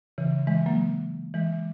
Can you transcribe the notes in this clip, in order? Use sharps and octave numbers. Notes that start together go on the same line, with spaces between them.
C#3 E3
E3 G#3
F#3 A#3
E3 G#3